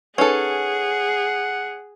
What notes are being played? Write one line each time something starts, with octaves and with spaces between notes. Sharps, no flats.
C#4 D#4 G#4 A4 B4 F#5